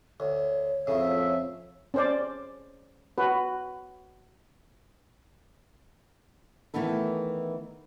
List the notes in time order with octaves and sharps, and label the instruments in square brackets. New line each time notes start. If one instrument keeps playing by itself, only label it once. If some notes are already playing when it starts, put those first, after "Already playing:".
[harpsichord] D2 [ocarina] C#5
[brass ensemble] F2 F3 E5 [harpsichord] A2 C#3
[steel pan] C#4 C5 D5
F#4 B4
[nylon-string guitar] D#3 E3 A3 B3 A4